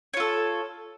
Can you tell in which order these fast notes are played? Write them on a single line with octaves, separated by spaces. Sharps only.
C#5 F4 A4